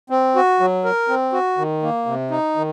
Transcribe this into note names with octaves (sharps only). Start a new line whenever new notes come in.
C4
F#4
F#3
A#4
C4
F#4
D#3
A#3
C3
D#4
D#3